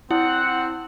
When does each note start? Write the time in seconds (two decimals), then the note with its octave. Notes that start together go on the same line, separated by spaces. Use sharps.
0.11 C4 E4 F#5